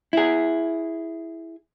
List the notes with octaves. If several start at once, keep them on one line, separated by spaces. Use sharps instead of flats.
E4 G#4